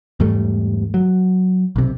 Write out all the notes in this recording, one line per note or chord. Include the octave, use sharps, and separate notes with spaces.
E2 G#2 G3 A3
F#3
B1 C3